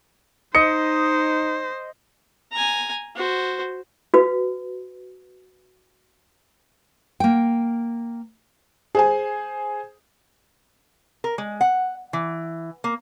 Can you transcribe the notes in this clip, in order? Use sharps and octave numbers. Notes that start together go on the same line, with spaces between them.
D#4 C5 D#5 C#7
G#5 A#5
F#4 C5
F#4 B4
A#3 G5
G#4 C5 G#5
A#4
G#3
F#5
E3
A#3